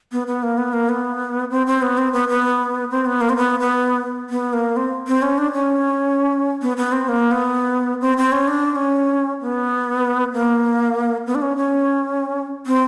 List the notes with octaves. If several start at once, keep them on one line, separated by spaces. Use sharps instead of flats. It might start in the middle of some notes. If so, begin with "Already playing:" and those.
B3
B3
A#3
B3
A#3
B3
C4
C4
B3
C4
B3
B3
C4
B3
A#3
C4
B3
B3
B3
A#3
C4
C4
C#4
D4
C#4
B3
B3
C4
A#3
B3
C4
C4
C#4
D4
D4
C#4
B3
A#3
B3
D4
C#4
C#4
C4